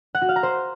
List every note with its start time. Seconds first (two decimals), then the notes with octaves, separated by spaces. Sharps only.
0.15 F#5
0.22 F#4
0.29 F5
0.36 A#5
0.43 C5